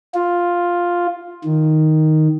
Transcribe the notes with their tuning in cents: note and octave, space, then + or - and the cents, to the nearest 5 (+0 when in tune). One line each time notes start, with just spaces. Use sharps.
F4 +5
D#3 +0